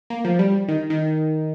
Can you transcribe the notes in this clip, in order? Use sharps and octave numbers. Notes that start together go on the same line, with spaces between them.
A#3
F3
G3
D#3
D#3